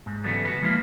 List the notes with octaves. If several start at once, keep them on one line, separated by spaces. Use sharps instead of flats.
G#2
C#3 E3 F#3 G3 A3 B3
F#4 B4
F3 G#3 A#3 E4